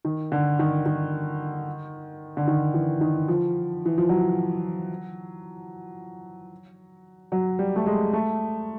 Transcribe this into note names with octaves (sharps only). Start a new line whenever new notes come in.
D#3
D3
D#3
D#3
D3
D#3
E3
D#3
F3
E3
F3
F#3
F#3
G3
A3
G#3
A3